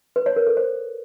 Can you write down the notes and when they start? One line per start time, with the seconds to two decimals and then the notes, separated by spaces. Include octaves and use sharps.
0.16 B4
0.26 C#5
0.36 A#4
0.47 A4
0.57 C5